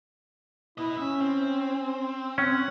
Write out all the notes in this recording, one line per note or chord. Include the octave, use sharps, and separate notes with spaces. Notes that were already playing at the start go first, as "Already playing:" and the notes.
B3 E4 D#5
C#4 E5
C4
C4 C#4 F#5